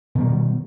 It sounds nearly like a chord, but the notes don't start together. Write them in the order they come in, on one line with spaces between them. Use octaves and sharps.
B2 D#3 G3